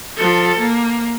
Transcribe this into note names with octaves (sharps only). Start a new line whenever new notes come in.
F3 A4
A#3